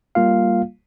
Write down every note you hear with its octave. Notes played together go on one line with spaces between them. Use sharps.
G3 A#3 F4 F5